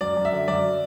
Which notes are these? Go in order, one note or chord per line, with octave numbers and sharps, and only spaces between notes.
F#2 D5
F#2
E5
D3
F#2 D5